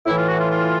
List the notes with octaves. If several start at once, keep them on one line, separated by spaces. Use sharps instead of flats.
A2 E3 E4
F4
F#4
F4
F4